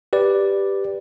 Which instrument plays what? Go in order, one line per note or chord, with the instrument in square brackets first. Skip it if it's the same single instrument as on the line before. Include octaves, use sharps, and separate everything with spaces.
[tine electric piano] G4 B4 D5